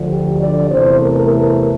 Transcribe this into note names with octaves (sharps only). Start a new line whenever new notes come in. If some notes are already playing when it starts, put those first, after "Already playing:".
Already playing: D2 D3 F3
G4
D5
E2 C3 E3 A3 C4 C5
A#4
A#4